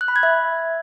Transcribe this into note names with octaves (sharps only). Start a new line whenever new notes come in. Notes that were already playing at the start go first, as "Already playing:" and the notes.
F#6
B5
G#6
E5